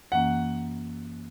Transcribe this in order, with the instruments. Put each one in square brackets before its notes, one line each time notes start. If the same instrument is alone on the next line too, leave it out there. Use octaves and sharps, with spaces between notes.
[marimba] F#2 E3 A#3 C#4 [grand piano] F#5